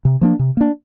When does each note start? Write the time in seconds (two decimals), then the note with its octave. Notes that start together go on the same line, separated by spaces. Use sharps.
0.05 C3
0.21 F3 A#3 D4
0.39 C3
0.57 A#3 D4